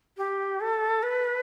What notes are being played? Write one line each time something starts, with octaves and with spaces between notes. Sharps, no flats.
G4
A4
B4